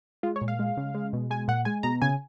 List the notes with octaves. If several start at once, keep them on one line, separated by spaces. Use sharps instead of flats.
G#3 F4
C#5
A#2
F5
G#3
C#3
G#3
B2
G#3 G#5
A#2 F#5
G#3 G#5
B2 A#5
C#3 G#5